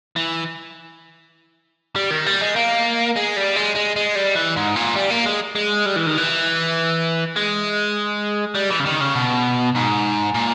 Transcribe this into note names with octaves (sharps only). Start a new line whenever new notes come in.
E3
G3
D#3
G3
G#3
A#3
G#3
G3
G#3
G#3
G#3
G3
E3
G#2
A#2
G3
A#3
G#3
G#3
G3
E3
D#3
E3
G#3
G3
E3
C#3
D#3
C#3
B2
G#2
A#2